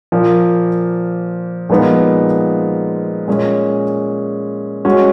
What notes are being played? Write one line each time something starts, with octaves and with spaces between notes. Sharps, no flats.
A#2 F3 A#3
A#2 F3 G#3 B3 D#4
A#2 G#3 C#4
G#3 C#4 F#4